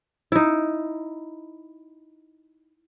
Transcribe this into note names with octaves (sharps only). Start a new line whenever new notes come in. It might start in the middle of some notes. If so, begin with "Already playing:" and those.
D#4 E4